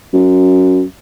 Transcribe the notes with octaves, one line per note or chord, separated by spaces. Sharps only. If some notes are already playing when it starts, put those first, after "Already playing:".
F#2